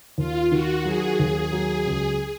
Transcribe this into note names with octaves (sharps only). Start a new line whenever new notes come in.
D#2 F4
D#3 F#4
F#3 G#4
D#2
F#3
C#2